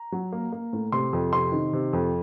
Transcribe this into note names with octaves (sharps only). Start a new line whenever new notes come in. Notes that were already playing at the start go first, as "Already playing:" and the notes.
Already playing: A#5
F#3
A#3
A#3
A2
C3 C6
F2
C3 C6
D#3
C3
F2